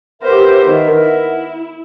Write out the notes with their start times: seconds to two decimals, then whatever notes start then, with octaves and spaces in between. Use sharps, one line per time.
0.22 B3 G4 A#4 C5 E5
0.66 D#3
0.97 E4